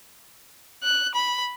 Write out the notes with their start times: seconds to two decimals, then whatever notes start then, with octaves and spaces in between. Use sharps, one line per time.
0.84 F#6
1.15 B5